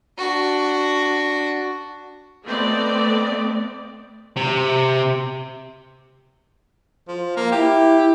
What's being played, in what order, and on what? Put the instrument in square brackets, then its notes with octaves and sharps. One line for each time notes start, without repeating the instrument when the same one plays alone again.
[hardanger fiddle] D4 F#4
[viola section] A3 B3 C4 D5 D#5
[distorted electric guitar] C3
[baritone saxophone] F3
A#3
[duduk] E4 [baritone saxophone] G4